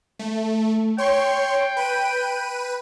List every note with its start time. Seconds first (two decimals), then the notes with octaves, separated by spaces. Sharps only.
0.19 A3
0.98 C#5 G5 C6 C#6
1.77 B4 D#7